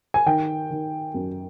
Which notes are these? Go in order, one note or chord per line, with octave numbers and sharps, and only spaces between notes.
G#5
D#3 G5
D#3
F#2